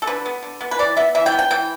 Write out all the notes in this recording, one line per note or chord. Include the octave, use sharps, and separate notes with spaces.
A4
D3 B4
B3
D3
B3
B4
E3 D5
B3 E5
E3 E5
G5
B3
G5
E3 G5